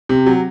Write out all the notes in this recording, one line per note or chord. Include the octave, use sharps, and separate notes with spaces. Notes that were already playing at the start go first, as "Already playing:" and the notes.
C3
F#3